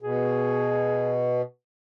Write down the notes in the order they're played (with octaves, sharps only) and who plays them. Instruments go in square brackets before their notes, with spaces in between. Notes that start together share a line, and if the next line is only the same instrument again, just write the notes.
[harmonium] B2 [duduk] G#4